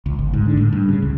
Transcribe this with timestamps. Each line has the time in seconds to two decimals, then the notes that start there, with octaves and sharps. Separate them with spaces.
0.06 C#2
0.19 G1
0.33 G#2
0.46 D3
0.57 A2
0.73 G2
0.89 C#3
1.03 C#2